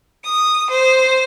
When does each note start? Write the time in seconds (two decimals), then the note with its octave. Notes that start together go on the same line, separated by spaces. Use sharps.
0.23 D#6
0.70 C5